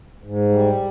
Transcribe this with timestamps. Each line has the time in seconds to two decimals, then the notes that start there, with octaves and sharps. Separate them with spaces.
0.24 G#2
0.49 G3